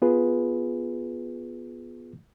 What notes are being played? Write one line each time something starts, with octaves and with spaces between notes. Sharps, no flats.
B3 F4 G#4 B4